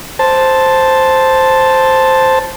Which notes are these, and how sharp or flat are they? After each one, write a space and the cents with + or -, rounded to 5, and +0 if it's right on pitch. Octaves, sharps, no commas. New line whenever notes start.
C5 +0 A5 +0